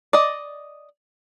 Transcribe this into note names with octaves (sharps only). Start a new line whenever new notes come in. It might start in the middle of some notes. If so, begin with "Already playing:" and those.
D5 D#5